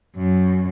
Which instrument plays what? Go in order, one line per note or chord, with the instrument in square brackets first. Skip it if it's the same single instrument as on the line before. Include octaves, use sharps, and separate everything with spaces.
[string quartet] F#2